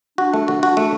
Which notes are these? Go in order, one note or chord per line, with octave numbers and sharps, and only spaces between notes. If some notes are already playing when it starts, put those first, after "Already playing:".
D4 F#4
A3
F#4
F#4
A3